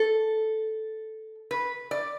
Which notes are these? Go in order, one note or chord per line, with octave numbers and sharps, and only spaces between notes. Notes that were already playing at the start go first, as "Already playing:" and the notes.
Already playing: A4
B4
D5